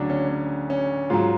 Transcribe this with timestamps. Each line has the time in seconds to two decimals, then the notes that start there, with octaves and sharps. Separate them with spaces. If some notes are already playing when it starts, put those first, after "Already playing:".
Already playing: D2 C#3 F#3 D4 F#4
0.10 C#4
0.29 C#4
0.70 C#4
1.10 G#2 F#3 F4